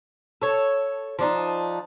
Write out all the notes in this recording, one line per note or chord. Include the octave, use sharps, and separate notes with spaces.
A4 C#5
F3 D4 D#4